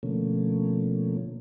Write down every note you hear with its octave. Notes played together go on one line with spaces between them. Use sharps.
B2 D3 F3 A3 A#3 C#4